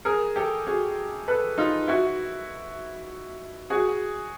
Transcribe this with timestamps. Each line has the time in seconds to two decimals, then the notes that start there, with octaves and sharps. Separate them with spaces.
0.05 G#4 A#4
0.36 G4 A4
0.67 F#4 G#4
1.28 A4 B4
1.58 D#4 F4
1.88 E4 F#4
3.70 F#4 G#4